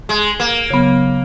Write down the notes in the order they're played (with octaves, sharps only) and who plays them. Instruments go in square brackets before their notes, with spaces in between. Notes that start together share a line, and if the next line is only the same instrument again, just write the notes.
[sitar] G#3
A#3
[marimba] C#3 F#3 B3